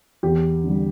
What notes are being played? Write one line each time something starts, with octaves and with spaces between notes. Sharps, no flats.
E2 G4
D3 G3